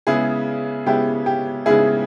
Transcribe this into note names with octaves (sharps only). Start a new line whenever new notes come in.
C#3 G#3 B3 E4 G#4
C#3 G#3 B3 E4 G4
G4
C#3 G#3 B3 E4 G#4